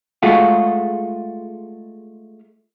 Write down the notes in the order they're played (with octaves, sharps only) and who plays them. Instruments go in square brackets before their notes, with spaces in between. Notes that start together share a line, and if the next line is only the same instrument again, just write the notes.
[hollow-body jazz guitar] G#3 A3 F4 F#4